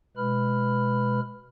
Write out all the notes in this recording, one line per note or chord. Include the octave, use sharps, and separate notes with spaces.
B2 G#3 B4 B5 F6